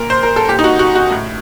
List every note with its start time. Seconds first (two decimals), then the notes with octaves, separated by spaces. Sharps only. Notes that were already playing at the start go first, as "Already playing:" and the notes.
Already playing: A#2 A#4
0.10 C5
0.23 A#4
0.36 A4
0.48 A#2 G4
0.59 D#4
0.64 F#4
0.79 F#4
0.95 F#4
1.11 A2